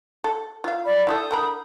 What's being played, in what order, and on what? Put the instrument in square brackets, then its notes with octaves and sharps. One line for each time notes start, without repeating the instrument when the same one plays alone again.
[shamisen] A4
F4 F5
[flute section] D5 B5
[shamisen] E4 F#4 A4 [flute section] D#6 G6
[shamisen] D3 A#4 B5